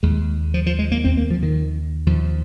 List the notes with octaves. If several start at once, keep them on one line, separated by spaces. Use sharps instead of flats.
D#2 G#3
F3
F3
G#3
A#3
D#2 C4
A#3
F3
D#3
D#2 F3